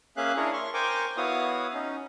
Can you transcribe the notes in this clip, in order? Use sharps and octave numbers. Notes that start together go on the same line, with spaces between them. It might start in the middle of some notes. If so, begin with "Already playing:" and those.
A#3 C#4 G#4 E5 F5 F#6
D4 E4 G#4 A#4 C#5
C6 C#6
A#4 C5 G5 G#5 C#6 D6
B3 E4 F#4 C#5 F5 D#6
C#4 D#4